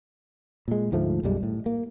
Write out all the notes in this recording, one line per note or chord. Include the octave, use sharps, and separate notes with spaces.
A#2 G#3
D2 G#2 F3 A3
B1 F#2 G3 G#3
A2
A#3